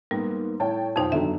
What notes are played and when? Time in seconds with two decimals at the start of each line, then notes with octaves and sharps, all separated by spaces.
0.11 G#2 G3 A#3 B3
0.60 A2 C#5 G5 A5
0.96 B1 F2 D#4 F4 C5 G5
1.12 G1 D3 F#3 E5